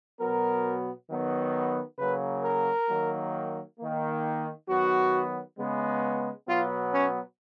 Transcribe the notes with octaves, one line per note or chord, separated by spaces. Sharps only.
B2 F#3 B3 A#4
D#3 F#3 B3
C#3 F#3 A#3 B4
A#4
D#3 F#3 A#3
D#3 A#3
D#3 F#3 B3 F#4
C#3 G#3 B3
B2 F#3 B3 F4
C#4